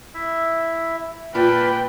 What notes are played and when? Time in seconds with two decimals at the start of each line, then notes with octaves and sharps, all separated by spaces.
0.14 E4 E5
1.35 A#2 B4 G5 A5 B5 F6